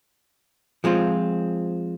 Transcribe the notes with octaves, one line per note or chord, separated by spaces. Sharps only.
F3 G#3 C4 F4